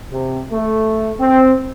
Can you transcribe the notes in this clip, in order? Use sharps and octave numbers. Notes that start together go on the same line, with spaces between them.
C3
A3
C4